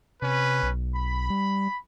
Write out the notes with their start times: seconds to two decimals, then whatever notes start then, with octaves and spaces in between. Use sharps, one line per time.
0.22 C3 C#4 B4
0.63 B1
0.95 B5
1.30 G3